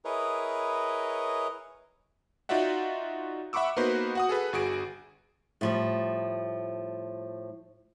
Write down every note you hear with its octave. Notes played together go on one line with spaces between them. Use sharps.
E4 G#4 A#4 B4 C#5 D#5
D#4 F4 F#4 D5 E5 F#5
E5 F#5 B5 C#6 D6 E6
A#3 B3 D#4 F#4 B4 C5
F#4 F#5 D#6
G#4 A4 B4
G1 F#4 G#4 D7
A2 F3 G3